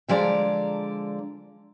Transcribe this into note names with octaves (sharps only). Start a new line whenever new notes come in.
D3 F3 G#3 D5 A#5